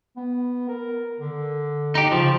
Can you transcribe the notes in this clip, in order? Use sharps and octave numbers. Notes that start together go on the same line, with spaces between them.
B3
A#4
D3
D#4 G4
C#3 F3